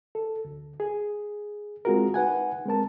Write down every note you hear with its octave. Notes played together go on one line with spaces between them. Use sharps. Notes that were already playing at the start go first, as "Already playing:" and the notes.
A4
D2
G#4
G#3 C4 F4 F#4 G#4 A#4
D#4 B4 F#5 G#5
G#3 C4 A#4 A5